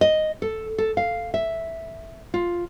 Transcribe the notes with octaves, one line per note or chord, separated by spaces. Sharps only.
D#5
A4
A4
F5
E5
F4